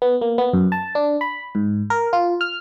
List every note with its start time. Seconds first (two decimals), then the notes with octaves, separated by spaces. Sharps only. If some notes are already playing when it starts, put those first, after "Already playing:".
0.02 B3
0.21 A#3
0.38 B3
0.53 F#2
0.72 A5
0.95 D4
1.21 B5
1.55 G#2
1.90 A#4
2.13 F4
2.41 F6